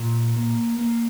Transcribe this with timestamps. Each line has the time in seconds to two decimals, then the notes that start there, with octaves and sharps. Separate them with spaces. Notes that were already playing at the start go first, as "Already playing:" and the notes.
Already playing: A#2
0.36 A#3
0.79 A#3